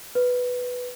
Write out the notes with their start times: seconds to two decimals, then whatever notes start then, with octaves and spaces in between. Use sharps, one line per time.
0.15 B4